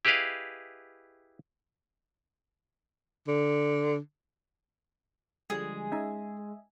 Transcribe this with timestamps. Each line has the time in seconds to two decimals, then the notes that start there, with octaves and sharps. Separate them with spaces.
0.05 E4 G4 G#4 B4 D#5 F5
3.28 D3
5.50 D3 F3 G3 G#3 G#4
5.92 C#4 D#4 D#5 E5 G#5